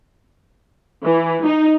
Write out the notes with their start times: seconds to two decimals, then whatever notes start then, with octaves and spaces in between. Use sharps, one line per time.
1.03 E3
1.44 D#4